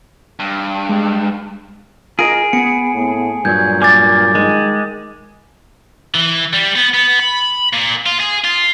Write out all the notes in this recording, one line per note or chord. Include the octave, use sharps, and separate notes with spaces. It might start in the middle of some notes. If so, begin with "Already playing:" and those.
G2
G#3
F4 G#4 A#4 D#5 D7
B3 C#7
A2
G2 A#2 F#3 G6 G#6
A#3 G#5 D6 A6
D#3 G#3
E3
G3
B3
B3
B5
A#2
F4
G#4
F4